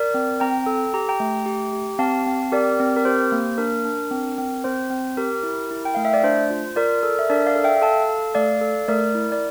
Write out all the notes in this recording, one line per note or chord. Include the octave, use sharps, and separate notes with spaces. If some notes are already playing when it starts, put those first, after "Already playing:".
Already playing: A#4 D5
C4
C4 G5 A#5
A4
G4 A#5
G5 A#5
A3
G4
G4
C4 F5 A5
C4
G4 A#4 D5
C4
A#4
G4 C5
A#3
D4 A#4
D4
C4
C4
C4 C5
C4
G4 A#4
E4
E4
G5
A3 F5
E5
D5
D4 C5
F4
F4 A#4 D5
A4
E5
D4 A#4 D5
D5 F5
A4
E5 G5
A4 F5 A5
A4
A3 D5 F5
A4
A3 A#4 D5
E4
D5